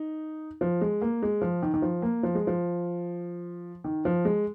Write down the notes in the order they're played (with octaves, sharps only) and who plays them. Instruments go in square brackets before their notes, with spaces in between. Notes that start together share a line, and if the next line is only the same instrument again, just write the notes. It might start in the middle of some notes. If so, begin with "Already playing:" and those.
Already playing: [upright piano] D#4
F3
G#3
A#3
G#3
F3
D#3
D#3
F3
A#3
F3
G#3
F3
D#3
F3
G#3